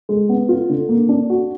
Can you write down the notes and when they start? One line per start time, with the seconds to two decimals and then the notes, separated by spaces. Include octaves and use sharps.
0.09 G#3
0.29 B3
0.49 F4
0.69 D3
0.89 A#3
1.09 D4
1.30 F#4